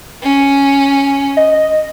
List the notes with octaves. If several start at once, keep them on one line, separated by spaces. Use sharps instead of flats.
C#4
D#5